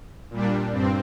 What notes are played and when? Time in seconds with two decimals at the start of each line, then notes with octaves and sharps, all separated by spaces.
0.30 A#2 G3 D4
0.72 G2 C4